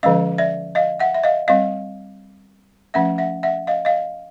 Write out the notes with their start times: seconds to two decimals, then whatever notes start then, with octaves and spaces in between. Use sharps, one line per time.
0.03 D3 F3 G#3 C#4 D#5 F5
0.38 D5 E5
0.75 D#5 F5
1.00 E5 F#5
1.15 E5
1.24 D#5 F5
1.48 G3 C4 D#5 F5
2.94 F3 A3 C#4 E5 F#5
3.18 E5 F#5
3.43 E5 F#5
3.67 D#5 F5
3.85 D#5 F5